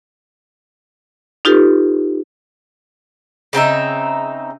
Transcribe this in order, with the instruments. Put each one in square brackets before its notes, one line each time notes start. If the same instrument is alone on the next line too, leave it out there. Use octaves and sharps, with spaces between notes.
[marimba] D#4 F4 G4 A4 B4
[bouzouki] C#3 C4 D#4 E5